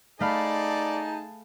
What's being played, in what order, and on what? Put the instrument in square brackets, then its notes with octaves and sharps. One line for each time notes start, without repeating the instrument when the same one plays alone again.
[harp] A3 F5 B5 [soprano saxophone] D#4 [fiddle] G#4 A5 [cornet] D5